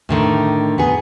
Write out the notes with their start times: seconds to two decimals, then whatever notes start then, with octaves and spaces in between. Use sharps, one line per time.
0.09 A2 D3 D#3
0.78 B3 G#4